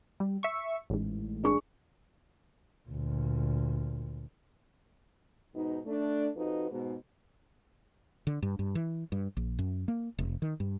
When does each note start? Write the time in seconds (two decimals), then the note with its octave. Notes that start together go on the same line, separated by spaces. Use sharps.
0.20 G3
0.43 E5 C#6
0.90 A1 G#2
1.44 D4 G#4 C#6
2.88 D2 A#2
5.55 G#2 B2 D#4
5.86 A3 D4
6.36 F2 D#4 F#4 B4
6.71 G#2 B2
8.27 D3
8.42 G2
8.59 G2
8.75 E3
9.12 G2
9.37 A#1
9.59 F#2
9.88 A#3
10.19 F1
10.42 D#3
10.60 G2